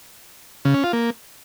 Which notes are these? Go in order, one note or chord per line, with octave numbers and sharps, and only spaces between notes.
C#3
C#4
F4
A#3